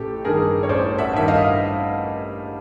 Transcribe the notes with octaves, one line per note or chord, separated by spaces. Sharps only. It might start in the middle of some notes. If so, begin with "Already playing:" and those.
Already playing: A1 G4 A4
G2 D#3 G#4 A#4
C#5
A1 C5 D5
E5 F#5
G2 D#3 E5
D#5 F5